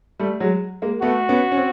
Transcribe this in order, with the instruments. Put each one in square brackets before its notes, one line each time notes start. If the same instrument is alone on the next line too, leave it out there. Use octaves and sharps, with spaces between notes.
[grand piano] G3 A3
F#3 G#3
G#3 A#3
[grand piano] A3 B3 [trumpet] F#4
[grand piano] B3 C#4
C#4
C4